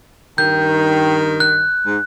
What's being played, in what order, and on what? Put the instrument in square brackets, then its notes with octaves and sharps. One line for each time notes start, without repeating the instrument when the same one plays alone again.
[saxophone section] G2 D#3 [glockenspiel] G6
[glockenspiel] F#6
[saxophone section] G#2